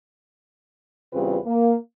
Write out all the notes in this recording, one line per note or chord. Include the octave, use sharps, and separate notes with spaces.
E2 C#3 G3 C4 F4 B4
A#3